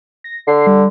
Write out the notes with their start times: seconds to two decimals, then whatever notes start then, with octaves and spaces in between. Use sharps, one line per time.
0.24 A#6
0.48 D3 C7
0.67 G3